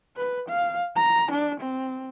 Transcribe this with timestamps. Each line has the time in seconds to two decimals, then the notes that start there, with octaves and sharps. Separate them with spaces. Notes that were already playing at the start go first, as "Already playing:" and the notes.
0.17 B4
0.49 F5
0.96 A#5
1.31 D4
1.60 C4